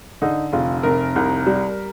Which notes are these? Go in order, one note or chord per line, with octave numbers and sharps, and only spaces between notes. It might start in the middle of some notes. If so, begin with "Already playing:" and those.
D3 D#4
F1 F4
F1 A#4
C2
G3